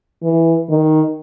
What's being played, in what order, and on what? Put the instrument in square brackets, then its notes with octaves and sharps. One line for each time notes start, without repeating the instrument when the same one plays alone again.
[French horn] E3
D#3